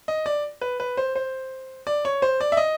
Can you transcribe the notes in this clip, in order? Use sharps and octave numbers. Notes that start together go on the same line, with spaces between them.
D#5
D5
B4
B4
C5
C5
D5
C#5
C5
D5
E5
D#5